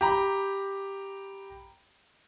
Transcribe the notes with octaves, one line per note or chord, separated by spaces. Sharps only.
G4 A#5 B5